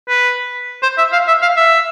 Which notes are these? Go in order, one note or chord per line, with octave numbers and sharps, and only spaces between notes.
B4
C5
E5
F5
E5
F5
E5